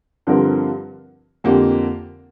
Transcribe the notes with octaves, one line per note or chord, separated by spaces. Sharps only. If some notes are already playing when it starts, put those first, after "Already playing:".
G2 D3 F3 C4 A#4
F2 D3 A#3 G4